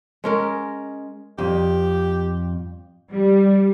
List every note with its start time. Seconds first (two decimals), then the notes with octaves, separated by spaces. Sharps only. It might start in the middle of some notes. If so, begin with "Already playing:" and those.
0.24 G#3 C#4 A#4
1.38 F2 G4
3.11 G3